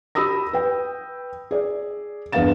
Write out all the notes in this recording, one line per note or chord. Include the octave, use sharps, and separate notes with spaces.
G4 B5 D#6 E6 A#6
B4 G5
G#4 D5
E2 G2 B3 F5 A6 E7